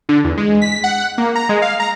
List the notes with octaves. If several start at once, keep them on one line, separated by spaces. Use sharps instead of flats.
D3
E2
G#3
B6
F#5
A#3
A#5
G#3
F5
A#5